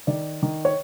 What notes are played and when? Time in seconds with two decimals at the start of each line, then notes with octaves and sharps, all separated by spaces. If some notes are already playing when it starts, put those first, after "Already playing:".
0.07 D#3 D5
0.43 D#3
0.65 C#5